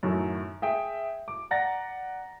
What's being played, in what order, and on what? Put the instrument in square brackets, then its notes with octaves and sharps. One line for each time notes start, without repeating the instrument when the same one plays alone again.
[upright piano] F#2 A2 D#3 F#3
G#4 E5 G5
D6
D5 F#5 A#5 A6 A#6